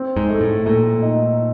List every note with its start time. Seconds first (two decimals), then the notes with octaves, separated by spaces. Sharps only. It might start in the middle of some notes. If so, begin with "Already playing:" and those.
Already playing: C4
0.17 G#2
0.29 A3
0.41 A2
0.65 A#2 A3
1.02 D#4